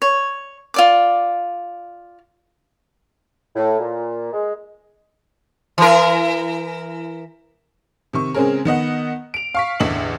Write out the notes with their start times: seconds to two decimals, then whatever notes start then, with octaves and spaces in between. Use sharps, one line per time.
0.02 C#5
0.74 F4 D5 D6
3.56 A2
3.80 A#2
4.32 G#3
5.78 E3 A#4
8.13 C3 D#3 C#6
8.34 C#3 G#3 C4 C#4 G#4 A#4
8.65 D#3 B3 D#5 F#5
9.34 D7 F7
9.55 F5 C#6 B6
9.80 A1 E2 D3 D#5 F#7